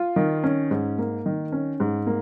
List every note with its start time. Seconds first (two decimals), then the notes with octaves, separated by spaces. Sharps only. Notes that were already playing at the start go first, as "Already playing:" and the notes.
Already playing: F4
0.16 D#3
0.44 C#4
0.71 G#2
0.99 A#3
1.26 D#3
1.52 C#4
1.80 G#2
2.07 A#3